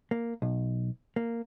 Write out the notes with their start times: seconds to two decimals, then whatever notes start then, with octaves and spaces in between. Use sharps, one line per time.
0.11 A#3
0.42 B1
1.16 A#3